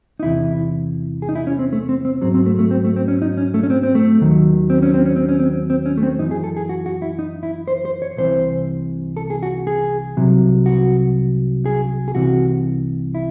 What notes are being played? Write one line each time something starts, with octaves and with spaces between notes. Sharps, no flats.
D#4
E2 C3 E3 E4
G#4
D#4
E4
C#4
C4
A3
C4
C4
G#2 F#3 C4
C4
A3
A3
C4
A3
C4
C#4
D#4
C#4
A3
C#4
C4
C4
A3
D#2 D#3 F#3
C4
C#4
C4
C#4
C4
C#4
C4
C4
C#4
A3
C4
F#2 E3 D#4
G#4
A4
G#4
F#4
F#4
E4
D#4
E4
C5
C5
C#5
C2 C3 E3 C5
A4
G#4
F#4
G#4
C2 C3 F#3
F#4
G#4
G#4
C2 C3 E3 F#4
E4